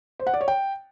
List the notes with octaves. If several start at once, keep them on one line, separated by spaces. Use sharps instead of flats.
C5
F#5
D5
C#5
G5